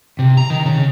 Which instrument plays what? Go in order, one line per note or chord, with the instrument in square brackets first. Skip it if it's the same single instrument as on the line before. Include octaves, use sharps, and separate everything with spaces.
[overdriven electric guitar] C3
A#5
D#3
C#3